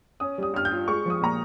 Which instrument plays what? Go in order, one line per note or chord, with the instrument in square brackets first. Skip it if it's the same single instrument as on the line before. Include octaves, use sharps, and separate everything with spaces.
[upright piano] C#4 D#6
G3 D#6
G2 F6
G6
F4
G#3 C#6
F3 D#6
A#2 A#5